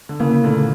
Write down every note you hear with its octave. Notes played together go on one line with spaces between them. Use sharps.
D3
C#3 E3 A#3
C#3
A#2 D3 A3